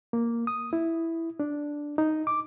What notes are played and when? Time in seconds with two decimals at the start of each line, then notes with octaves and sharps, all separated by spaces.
0.13 A#3
0.47 D#6
0.73 E4
1.40 D4
1.98 D#4
2.27 D6